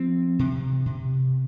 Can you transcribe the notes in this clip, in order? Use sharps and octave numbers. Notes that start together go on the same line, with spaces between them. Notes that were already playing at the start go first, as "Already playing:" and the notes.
Already playing: F3 C4
C3
C3